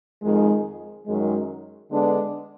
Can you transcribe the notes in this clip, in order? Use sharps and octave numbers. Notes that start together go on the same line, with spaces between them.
F2 D#3 G#3
F#2 D#3 G#3
D3 G#3 B3 D4